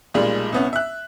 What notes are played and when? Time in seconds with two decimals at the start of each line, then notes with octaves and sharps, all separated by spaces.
0.14 B1 A#2 G3 G#3
0.53 C2 B3 C#4
0.73 E5 F#6